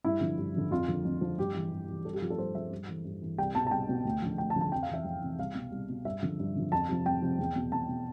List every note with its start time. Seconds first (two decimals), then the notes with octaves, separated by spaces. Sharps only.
0.05 G2 E4
0.20 D3 F3
0.38 G2
0.54 D3 F3
0.71 F2 F4
0.88 D3 F3
1.05 F2
1.21 D3 F3
1.38 G2 G4
1.55 E3
1.71 G2
1.88 E3
2.05 G2 A4
2.13 G4
2.22 F3 F4
2.30 A4
2.38 G2 C5
2.54 F3 E5
2.71 G2
2.89 E3
3.05 G2
3.22 E3
3.38 C2 G5
3.55 B2 A5
3.67 A5
3.71 C2 G5
3.89 B2
4.05 D2
4.22 D3 F3
4.38 D2 G5
4.50 A5
4.56 D3 F3
4.61 A5
4.72 F2 G5
4.83 F5
4.89 C3 E3 E5
5.05 F2
5.22 C3 E3
5.38 C2 F5
5.55 B2
5.72 C2
5.89 B2
6.05 G2 E5
6.22 D3 F3
6.40 G2
6.56 D3 F3
6.72 F2 A5
6.89 C3 F3
7.06 F2 G5
7.22 C3 F3
7.39 E2
7.56 B2
7.72 E2 A5
7.89 B2